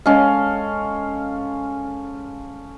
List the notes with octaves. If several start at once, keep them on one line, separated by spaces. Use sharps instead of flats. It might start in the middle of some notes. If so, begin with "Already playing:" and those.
G#3 C#4 A4 F5